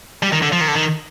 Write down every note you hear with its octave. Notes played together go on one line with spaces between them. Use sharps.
G3
D#3
D3
F3
D#3
D3
D#3